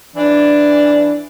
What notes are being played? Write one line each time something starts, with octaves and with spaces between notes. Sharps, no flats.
E3 D4